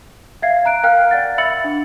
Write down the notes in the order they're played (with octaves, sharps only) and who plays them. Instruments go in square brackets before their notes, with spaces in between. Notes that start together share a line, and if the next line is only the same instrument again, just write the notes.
[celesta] E5 F5 G#6 C7
A#5 F#6 D7
A#4 F5 G5 F6 F#6
D5 F#5 A6
E5 B5 E6 A6 C#7 F#7
D4